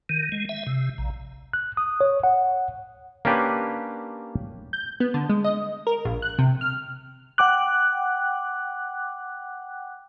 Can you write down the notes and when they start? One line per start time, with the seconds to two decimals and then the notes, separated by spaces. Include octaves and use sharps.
0.09 D#3
0.32 G#3
0.49 E5
0.67 C3
0.98 A#1
1.53 F#6
1.77 D#6
2.01 C#5
2.24 F#5
3.25 A#3 C#4 D4 G4 B4
4.73 G6
5.00 B3
5.14 D3
5.30 G#3
5.44 D#5
5.87 A#4
6.05 A#1
6.22 F#6
6.39 C3
6.61 F6
7.38 F#5 G5 D6 F#6